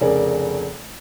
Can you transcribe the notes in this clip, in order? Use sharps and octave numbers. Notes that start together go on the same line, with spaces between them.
F1 C#3 G#4 A#4 D5